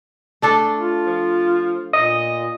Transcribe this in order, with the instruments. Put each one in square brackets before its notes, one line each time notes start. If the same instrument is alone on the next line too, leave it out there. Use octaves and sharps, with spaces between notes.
[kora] A3 D4 A4
[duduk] F4
[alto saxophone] F3
[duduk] A#2 [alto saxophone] D#5